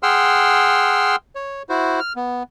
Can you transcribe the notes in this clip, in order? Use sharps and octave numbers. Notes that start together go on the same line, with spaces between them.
G#4 F#5 G5 C6 E6 F6
C#5
E4 F#4 C5
F6
B3